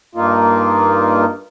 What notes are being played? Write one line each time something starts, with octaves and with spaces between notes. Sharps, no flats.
G2 A#3 D#4 F4